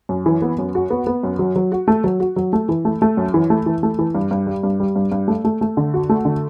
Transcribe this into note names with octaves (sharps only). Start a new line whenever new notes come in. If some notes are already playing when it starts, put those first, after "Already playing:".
F#2
E3
B3
F#2
F#4
B3
B3
F#2
F#3
F#3
F#4
A3
F#3
F#4
F#3
A3
E3
A3
A3
F#2
E3
A3
E3
A3
E3
G2
G2
G3
G2
G3
G2
G2
A3
A3
A3
D3
F#4
A3
D3